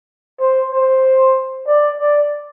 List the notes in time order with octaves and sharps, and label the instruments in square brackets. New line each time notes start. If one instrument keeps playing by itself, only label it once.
[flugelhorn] C5
C5
D5
D5